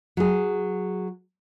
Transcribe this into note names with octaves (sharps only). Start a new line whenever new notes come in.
F#3 G#4